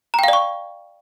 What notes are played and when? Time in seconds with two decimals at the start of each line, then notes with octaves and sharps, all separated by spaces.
0.14 A#5
0.19 G5
0.23 F5
0.28 D5
0.33 C#6